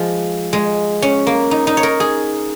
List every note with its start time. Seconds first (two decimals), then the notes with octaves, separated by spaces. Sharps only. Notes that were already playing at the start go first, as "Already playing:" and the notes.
Already playing: F3 G#3
0.53 G#3
1.02 C#4
1.27 A#3
1.51 D#4
1.67 D#4
1.77 C#5
1.83 A#4
2.00 G#4